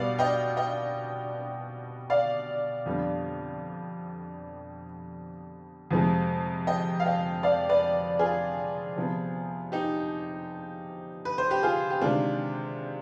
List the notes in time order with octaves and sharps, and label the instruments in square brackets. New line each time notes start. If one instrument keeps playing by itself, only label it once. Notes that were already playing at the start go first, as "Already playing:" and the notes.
Already playing: [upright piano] B2 G3 B3 D5 F5
D#5 G5
D#5 G5
D5 F5
F2 D3 G3 B3
F2 C3 F3 G#3
D#5 G5
F5
D#5 G5
D5 F5
B4 D5
F4 G#4
C3 F3 B3
D#4 G4
B4
C5
G4 B4
F4 G#4
G4
C3 D#3 G#3 D4 F4